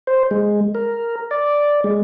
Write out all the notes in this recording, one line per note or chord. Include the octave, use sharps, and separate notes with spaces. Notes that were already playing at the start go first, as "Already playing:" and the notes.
C5
G#3
A#4
D5
G#3